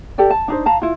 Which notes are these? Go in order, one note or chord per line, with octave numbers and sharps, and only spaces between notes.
G4 A4 D5 G5
A5
D4 D#4 C5
F5 A5 A#5
E4 F4